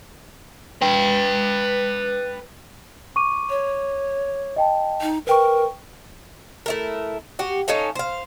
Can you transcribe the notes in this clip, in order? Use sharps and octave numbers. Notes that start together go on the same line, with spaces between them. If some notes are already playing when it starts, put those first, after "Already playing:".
B4 G5
C#6 D6 D#7
C#5
D#5 G5 A5
D#4
A#4 B4 G5 C#6
A3 E4 A#4
F#4 G4
C#4 D#4 A4 F5
C5 F5